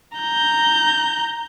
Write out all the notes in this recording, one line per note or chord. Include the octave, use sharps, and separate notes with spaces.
A#5 G6